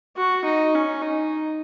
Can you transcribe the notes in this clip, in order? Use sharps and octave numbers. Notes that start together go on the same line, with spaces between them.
F#4
D#4
C#4
D#4